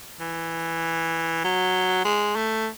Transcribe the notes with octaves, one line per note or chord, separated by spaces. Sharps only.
E3
F#3
G#3
A3